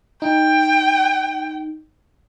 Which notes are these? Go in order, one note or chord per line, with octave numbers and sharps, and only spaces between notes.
D#4 G5